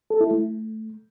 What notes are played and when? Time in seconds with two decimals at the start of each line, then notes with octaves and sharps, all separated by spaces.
0.10 A4
0.21 E4
0.31 A3